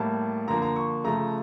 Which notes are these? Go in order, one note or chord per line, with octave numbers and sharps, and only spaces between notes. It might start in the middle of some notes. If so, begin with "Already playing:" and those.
Already playing: A2 G3 A#3 A5
D3 F3 A#3 A#5
A#5
C#6
C#3 F3 A3 A#5